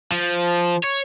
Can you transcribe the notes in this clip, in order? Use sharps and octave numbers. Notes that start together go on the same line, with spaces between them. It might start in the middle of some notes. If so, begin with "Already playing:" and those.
F3
C#5